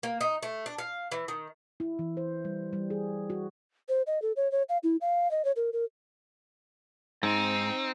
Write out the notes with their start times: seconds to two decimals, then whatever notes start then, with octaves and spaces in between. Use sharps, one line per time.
0.03 A#3
0.21 D#4
0.43 A3
0.66 D4
0.78 F5
1.11 E3
1.28 D#3
1.80 E4
1.99 E3
2.17 C5
2.45 G3
2.73 G3
2.90 G#4
3.30 F#4
3.88 C5
4.07 D#5
4.22 A4
4.36 C#5
4.51 C#5
4.69 F5
4.83 E4
5.01 F5
5.31 D#5
5.45 C#5
5.56 A#4
5.73 A#4
7.23 G#2 C4 D#4